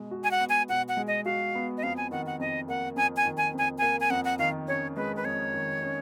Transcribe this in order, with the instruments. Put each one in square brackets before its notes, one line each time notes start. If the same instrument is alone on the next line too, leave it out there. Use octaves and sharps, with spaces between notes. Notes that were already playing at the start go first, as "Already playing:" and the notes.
Already playing: [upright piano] B2 G#3
F#4
[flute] G#5
F#5
[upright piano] B3
[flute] G#5
[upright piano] B2 [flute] F#5
[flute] F#5
[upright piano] G#3
[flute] D#5
[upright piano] F#4 [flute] F5
[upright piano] B3
[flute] D#5
[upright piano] F2 [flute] F5
[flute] G#5
[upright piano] D#3 [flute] F#5
[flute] F#5
[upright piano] F2 [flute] D#5
[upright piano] A#3 [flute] F#5
[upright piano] F2 [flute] G#5
[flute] G#5
[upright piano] D#3
[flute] G#5
[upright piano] F2 [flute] G#5
[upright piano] A#3 [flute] G#5
[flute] G#5
[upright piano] F2 [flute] F#5
[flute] F#5
[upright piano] D#3 [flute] F5
[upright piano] C#4 [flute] C#5
[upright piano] G#3 [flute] B4
[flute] B4
[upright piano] F2 [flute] C#5
[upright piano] D#3
C#4